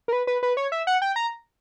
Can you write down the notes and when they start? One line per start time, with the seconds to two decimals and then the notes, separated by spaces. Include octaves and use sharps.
0.08 A#4
0.13 B4
0.27 B4
0.43 B4
0.57 C#5
0.72 E5
0.87 F#5
1.02 G5
1.16 A#5